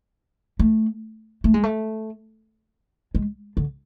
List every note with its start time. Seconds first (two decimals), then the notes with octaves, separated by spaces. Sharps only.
0.59 A3
1.44 A3
1.54 G#3
1.63 A3
3.15 G#3
3.57 D3